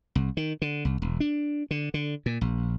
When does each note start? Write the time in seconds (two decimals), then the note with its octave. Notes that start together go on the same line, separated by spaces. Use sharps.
0.15 C2
0.37 D#3
0.62 D3
0.85 C2
1.02 E1
1.20 D4
1.71 D3
1.94 D3
2.26 A#2
2.41 A#1